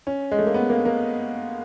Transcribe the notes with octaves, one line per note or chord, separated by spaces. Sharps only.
C#4
G#3
A3
A#3
B3
A#3
A#3